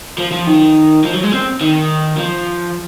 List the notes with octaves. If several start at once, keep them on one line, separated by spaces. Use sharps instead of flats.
F3
F3
D#3
F3
F#3
G#3
C4
D#3
F3